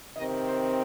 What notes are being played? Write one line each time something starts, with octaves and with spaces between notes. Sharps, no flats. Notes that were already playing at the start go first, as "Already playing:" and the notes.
C3 D#3 C4 D#5
C5